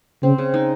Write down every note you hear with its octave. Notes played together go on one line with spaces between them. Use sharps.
C#3 C4
C#3
D#4